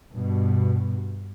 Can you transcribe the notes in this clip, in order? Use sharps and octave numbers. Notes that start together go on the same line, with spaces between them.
G2 B2